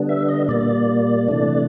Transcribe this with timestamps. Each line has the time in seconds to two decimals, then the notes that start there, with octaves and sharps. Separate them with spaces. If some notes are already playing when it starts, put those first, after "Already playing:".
Already playing: D3 G3 B3 D4
0.09 E5
0.29 D#5
0.48 A#2 G3 A#3 D5
1.28 C3 E3 A3 D4